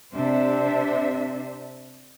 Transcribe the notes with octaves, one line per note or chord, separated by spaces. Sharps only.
C3 D4 C5 E5